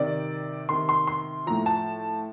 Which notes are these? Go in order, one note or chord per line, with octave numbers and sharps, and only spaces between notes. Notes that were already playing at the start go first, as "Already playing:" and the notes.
Already playing: C3 D#3 D5
C3 D#3 C6
C6
C6
A2 F3 A#5
A5